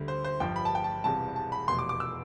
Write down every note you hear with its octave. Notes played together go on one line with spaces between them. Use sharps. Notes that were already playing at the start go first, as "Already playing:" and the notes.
Already playing: D2 D3 G3
C5
C5
G1 G2 F3 G5
B5
A5
G5
A5
E1 E2 C3 G3 A5
A5
B5
F1 E2 B2 C6
D6
D6
E6